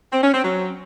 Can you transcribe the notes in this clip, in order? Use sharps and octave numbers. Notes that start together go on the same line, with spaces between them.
C4
C#4
C4
F#3